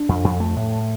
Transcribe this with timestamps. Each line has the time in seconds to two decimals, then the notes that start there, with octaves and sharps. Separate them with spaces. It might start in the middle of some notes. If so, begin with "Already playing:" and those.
Already playing: D4
0.09 F2
0.24 F2
0.40 A3
0.56 A2